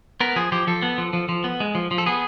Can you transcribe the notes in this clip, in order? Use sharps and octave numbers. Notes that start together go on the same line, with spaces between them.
B3 A#4
F3 G#4
F3 G4
F3 A4
B3
F3
F3
F3
B3
G#3
F3
F3
A4
B3 G#4